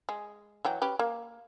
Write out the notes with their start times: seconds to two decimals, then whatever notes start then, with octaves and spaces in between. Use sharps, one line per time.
0.09 G#3
0.65 E3 F#3 G5
0.82 C#4 G4 B4
0.99 A#3